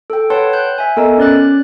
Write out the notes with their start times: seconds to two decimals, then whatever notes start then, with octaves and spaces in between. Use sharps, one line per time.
0.10 A4 G5
0.30 B4 C#5 F#5 G5 A5 C6
0.53 F#6 G6
0.78 E5 G#5
0.97 B3 A4 A#4 D#5 A#5
1.18 C#4 D5 F#6 A6